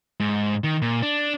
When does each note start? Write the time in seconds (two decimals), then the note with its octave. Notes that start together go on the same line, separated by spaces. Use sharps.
0.20 G#2
0.64 D#3
0.82 A#2
1.02 D4